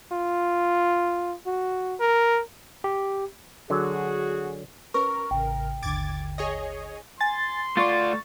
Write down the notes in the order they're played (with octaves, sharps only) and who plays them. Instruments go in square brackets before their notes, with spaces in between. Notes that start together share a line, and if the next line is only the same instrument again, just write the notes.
[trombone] F4
F#4
A#4
[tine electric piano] G4
[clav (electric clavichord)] D3 F#3 [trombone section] F#4 G#4
[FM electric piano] C#4 B4 [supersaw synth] A#4 [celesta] C#6
[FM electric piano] A1 C#3 [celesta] G5
[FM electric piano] G#1 D#2 D3 [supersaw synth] D6 G#6 A6
[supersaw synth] G#4 C#5 D#5
[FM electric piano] G#5 A6 [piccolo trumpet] C6
[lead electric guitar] A3 D5 [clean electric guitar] F4 [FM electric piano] C#6 A6